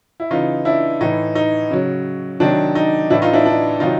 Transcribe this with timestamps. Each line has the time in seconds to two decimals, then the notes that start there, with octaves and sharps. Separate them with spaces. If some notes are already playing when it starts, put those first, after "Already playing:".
0.20 E4
0.31 C#3 E3 D#4 F4
0.65 D4 E4
1.01 A2 E3 D#4
1.35 D#4
1.71 C#3 F#3
2.40 C3 D#3 F#3 D4
2.75 D#4
3.10 A2 E3 D4 E4
3.22 D#4 F4
3.33 D4 E4
3.46 D4
3.80 C3 D#3 F#3 D#4 F4